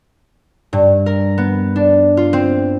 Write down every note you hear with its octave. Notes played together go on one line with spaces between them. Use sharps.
G2
A#4
B3
D4
F4
C4